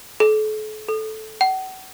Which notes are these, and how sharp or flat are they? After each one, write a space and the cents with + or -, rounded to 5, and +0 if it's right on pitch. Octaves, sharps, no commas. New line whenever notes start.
A4 -40
A4 -10
F#5 +35